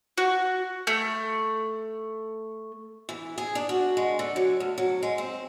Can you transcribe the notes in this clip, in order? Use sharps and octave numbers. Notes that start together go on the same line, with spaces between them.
F#4
A3
E3
G#4
D4
F#4
G#3
D3
F#3
D2
F#3
G#3
C4